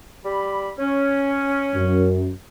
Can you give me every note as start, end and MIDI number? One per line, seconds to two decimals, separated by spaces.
0.24 0.69 55
0.24 0.69 67
0.24 0.69 83
0.78 2.09 61
1.75 2.29 42